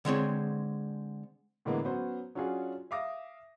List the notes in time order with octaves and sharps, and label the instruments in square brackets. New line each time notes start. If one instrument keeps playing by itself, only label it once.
[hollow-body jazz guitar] D3 G#3 C4 C#5
[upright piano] A2 D3 E3 G#3 A#3 B3
F#3 B3 C#4 C5
F#3 C#4 D4 F4 F#4 G#4
E5 F5 D6 D#6 A#6